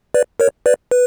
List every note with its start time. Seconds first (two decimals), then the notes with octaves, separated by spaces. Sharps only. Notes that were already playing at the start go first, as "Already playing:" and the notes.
0.14 B4 D5
0.40 A#4 C#5
0.66 B4 D5
0.91 B4